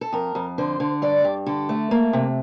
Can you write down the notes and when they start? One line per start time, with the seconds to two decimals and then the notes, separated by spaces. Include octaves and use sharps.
0.01 A4
0.13 F2 A#4
0.35 F2
0.58 D3 C5
0.80 D3
1.02 G2 D5
1.24 G2
1.46 D3 A4
1.69 A3
1.91 A#3
2.13 C3